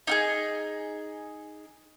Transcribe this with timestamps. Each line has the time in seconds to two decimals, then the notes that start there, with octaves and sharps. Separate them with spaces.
0.07 D#4 F4 G#4